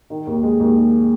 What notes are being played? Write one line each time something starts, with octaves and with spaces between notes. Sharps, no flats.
D#3
D#2
G#3
D#2
D#3